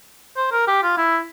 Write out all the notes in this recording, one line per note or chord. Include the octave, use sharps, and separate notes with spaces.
C5
A#4
G4
F4
E4